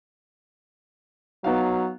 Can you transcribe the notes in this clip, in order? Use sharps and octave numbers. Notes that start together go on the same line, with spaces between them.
F#3 B3 D#4 F5